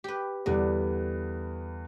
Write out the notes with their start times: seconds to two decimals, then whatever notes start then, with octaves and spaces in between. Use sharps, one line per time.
0.04 G4 B4
0.46 E2 D3 G3 B3